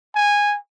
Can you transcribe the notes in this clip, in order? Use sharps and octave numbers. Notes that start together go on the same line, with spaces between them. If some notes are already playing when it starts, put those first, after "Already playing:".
G#5